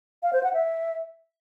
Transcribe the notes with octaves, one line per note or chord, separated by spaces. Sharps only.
F5
C5
F#5
E5